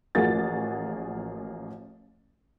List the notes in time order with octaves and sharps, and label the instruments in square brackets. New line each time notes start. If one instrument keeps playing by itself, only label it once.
[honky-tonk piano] A1 F3 A#3 F#4 G#4 A6